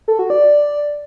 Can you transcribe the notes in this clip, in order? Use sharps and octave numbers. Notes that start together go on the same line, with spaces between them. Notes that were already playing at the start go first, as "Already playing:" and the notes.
A4
F#4
D5